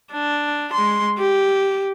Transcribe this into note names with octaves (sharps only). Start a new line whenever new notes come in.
D4
G#3 C6
G4